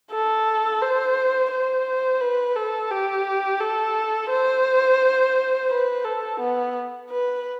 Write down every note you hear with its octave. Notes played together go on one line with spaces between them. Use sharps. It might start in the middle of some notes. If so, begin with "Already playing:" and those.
A4
C5
C5
B4
A4
G4
A4
C5
B4
A4
B3
B4